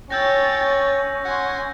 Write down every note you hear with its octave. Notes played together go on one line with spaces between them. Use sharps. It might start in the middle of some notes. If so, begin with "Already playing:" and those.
C#4 C#5 G5 E6 G6 A6 A#6
F#5 G#5 C6